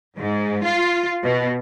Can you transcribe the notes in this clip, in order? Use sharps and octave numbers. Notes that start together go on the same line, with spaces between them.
G#2
F4
B2